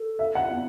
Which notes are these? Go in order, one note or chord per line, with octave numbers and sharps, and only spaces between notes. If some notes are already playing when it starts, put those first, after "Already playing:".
Already playing: A4
E5
F#5
B3